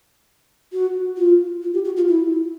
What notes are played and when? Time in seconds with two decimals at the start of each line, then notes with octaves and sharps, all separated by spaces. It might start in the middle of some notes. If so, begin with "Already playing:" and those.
0.72 F#4
1.17 F4
1.62 F4
1.74 G4
1.85 F#4
1.97 F4
2.08 E4